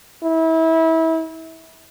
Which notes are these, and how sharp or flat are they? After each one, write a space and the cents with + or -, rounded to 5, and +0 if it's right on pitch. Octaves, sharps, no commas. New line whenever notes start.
E4 -30